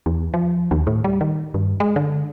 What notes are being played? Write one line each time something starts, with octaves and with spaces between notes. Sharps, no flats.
E2
F3
D#2
A2
G3
D#3
G2
G#3
D3